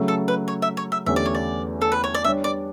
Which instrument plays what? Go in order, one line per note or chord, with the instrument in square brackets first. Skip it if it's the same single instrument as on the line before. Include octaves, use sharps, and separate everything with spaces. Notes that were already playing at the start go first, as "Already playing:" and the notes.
Already playing: [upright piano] C#3 F#3 A3
[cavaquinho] A4
B4
C#5
E5
C#5
E5
[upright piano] E2 D3 A3 C#4 G4 [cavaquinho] E5
[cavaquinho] D5
C#5
D5
A4
B4
C#5
D5
[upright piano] G3 D4 G4 C#5 [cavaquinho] E5
[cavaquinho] D5